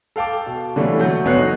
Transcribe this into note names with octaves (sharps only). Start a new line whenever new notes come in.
A4 F5 G5 A5 D6
B2
D3 E3 G3 A3 A#3 C#4
F#3 A3 F#4 G6
G1 D3 B3 C#5 F#6 C7
D#4 F#4 D#5